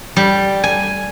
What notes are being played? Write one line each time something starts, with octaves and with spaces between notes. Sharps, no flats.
G3
G#5